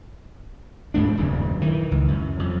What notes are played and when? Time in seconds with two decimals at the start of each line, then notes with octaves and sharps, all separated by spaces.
0.94 F2 G#2 A3 D4
1.17 D#1 F#2 C#3
1.60 D#3 E3
1.91 C#2
2.08 F#2
2.39 F2